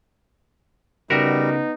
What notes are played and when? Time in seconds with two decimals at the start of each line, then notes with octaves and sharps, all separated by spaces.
1.10 C#3 G3 B3 D#4 F#4 A#4 E5